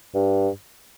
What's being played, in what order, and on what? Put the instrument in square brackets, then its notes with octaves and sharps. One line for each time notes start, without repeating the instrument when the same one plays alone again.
[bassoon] G2